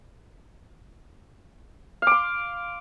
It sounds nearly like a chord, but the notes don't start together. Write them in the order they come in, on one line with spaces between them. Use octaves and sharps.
F5 D6 C6